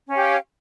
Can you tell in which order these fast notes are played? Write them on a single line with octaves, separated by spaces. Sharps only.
C#4 F5 G4